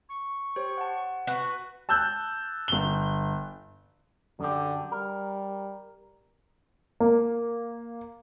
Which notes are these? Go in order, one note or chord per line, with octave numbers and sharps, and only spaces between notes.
C#6
G4 C5 C#5
F#5 A5
F#4 B4
A5 E6 F#6 G6
G1 G7
F#2 D3 G4
G3 A#4
A#3